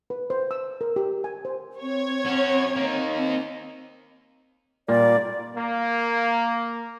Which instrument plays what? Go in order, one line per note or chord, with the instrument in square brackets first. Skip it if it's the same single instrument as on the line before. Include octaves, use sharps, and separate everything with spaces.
[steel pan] B4
C5
E6
A#4
G4
G#5
C5
[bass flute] C4 [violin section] C#5 G#6
[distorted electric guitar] C#4 F#4
A#3 D#4
[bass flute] C4
[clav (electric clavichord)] A#2 G3 A#3 [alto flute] D5
[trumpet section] A#3